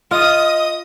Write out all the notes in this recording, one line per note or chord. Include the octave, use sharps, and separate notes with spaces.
F4 D#5 D#6